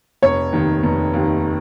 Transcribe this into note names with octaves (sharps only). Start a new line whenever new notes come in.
F1 C#5
D#2 D#3
F1
D#2 D#3